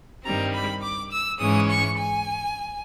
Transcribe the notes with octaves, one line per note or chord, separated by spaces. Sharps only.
G2 D#3 G3 C4 A#5
B5
D6
E6
G#2 E3 G#3 C#4 D#6
C#6
G#5